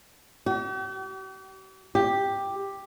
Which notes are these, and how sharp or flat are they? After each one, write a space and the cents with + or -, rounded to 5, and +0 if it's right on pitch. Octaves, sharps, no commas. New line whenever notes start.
G4 -45
G4 +5